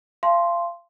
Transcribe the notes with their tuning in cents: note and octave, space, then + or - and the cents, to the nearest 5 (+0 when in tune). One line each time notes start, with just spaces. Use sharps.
F5 -30 A5 -45 C6 +0